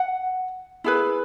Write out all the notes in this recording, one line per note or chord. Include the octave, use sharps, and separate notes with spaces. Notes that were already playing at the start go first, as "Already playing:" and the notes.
Already playing: F#5
E4 G#4 B4